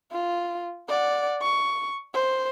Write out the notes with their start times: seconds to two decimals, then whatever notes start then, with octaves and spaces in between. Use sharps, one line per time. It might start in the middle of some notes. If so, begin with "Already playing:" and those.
0.12 F4
0.89 D5 F#5
1.42 C#6
2.14 C5